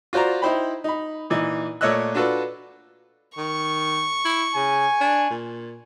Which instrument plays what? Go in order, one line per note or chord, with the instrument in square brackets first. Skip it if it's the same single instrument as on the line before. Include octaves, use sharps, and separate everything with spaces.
[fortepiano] F4 F#4 C5 D5 A#5
D#4 E4 C5 G5 B5
D#4 B5
A#2 E3 D#4
A#2 A3 C#5 D#5 E6 F#6
D4 F4 F#4 A4 B4
[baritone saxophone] D#3 [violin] C#6
[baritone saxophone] E4
[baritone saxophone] C#3 [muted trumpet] G#5
[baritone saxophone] D4
A#2